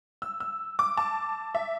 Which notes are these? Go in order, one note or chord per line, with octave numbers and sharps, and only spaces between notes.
E6
E6
D6
A5
E5